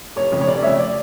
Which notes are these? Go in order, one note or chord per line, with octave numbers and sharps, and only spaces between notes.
F1 C#5
F2 C#3
C#5
F1 D5
F2 C#3 C#5 E5
D5